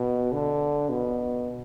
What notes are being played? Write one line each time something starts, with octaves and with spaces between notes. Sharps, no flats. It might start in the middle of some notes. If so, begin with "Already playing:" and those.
Already playing: B2
D3
B2